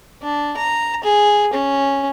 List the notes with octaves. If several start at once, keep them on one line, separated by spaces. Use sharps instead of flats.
D4
A#5
G#4
C#4